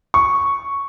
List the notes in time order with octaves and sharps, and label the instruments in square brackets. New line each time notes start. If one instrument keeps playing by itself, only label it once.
[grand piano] C#6